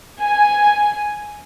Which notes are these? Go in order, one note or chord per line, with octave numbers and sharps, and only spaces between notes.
G#5